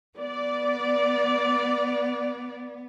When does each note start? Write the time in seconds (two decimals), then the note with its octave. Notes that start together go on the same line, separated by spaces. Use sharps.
0.19 B3 D5